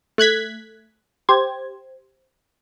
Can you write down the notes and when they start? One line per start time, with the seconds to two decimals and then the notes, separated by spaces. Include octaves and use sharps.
0.18 A3 F#6 G#6 B6
1.29 G4 C5 G#6